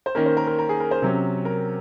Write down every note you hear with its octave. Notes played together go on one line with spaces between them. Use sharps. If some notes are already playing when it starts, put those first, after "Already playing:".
C5
D#3 A#3 C#4 A#4
C5
A#4
A#4
A#4
G#4
A#4
C5
C3 F#3 C#4
A#4